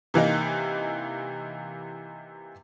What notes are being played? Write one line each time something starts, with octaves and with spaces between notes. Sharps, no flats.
C3 E3 A#3 D#4